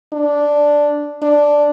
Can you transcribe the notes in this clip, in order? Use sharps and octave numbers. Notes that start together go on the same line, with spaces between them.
D4
D4